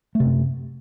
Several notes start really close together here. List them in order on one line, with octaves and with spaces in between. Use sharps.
A3 C3 F#2